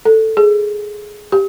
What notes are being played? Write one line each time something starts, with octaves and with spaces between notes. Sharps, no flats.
A4
G#4
G4